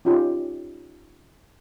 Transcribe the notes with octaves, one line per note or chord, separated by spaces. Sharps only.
C#4 D#4 F4 G4